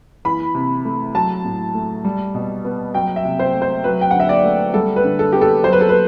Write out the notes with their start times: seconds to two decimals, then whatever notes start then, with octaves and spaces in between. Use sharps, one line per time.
0.25 E3 B5
0.55 C3
0.85 A3
1.15 F#3 A5
1.45 A2
1.75 A3
2.05 G3
2.34 B2
2.65 B3
2.94 F#3 G5
3.16 E5
3.24 C3
3.39 C5
3.54 A3
3.62 C5
3.84 F#3 B4
4.01 G5
4.11 D3 F#5
4.20 E5
4.29 D5
4.44 A3
4.74 G3 A4
4.96 B4
5.04 D3
5.19 A4
5.32 B3 G4
5.41 A4
5.63 F#3 C5
5.73 B4
5.81 A4
5.89 B4